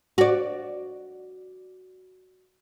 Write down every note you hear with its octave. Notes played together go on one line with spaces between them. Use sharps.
F#4 D5